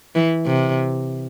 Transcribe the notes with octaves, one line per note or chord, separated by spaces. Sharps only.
E3
C3